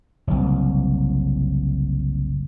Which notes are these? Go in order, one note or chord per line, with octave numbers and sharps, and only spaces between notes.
F#1 C2